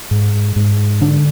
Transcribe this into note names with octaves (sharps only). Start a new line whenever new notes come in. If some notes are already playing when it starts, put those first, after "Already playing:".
G#2
G#2
D3 D4